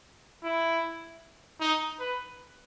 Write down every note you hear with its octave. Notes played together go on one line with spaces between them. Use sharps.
E4
D#4
B4